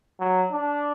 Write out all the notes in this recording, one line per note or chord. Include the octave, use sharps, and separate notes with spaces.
F#3
D4